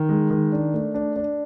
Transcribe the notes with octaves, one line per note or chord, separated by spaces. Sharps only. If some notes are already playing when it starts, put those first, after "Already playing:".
Already playing: D#3
G#3
D#3
D4
A3
D4
D4